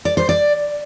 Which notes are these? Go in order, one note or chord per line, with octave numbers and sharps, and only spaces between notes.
D5
C5
D5